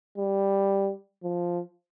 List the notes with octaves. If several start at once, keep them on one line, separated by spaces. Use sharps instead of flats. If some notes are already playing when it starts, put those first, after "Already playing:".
G3
F3